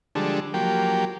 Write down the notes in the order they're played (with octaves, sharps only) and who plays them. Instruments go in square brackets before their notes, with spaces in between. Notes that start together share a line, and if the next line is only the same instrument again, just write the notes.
[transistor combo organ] D3 F3 G3 G#3 D4 A4
F3 F#3 A#3 G4 G5